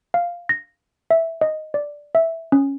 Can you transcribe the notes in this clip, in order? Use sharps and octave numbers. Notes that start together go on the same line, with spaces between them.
F5
A#6
E5
D#5
D5
E5
C#4